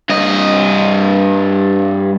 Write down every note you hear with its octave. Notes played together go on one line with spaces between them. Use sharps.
G2 D#5